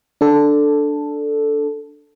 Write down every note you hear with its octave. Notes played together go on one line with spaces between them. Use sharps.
D4 A4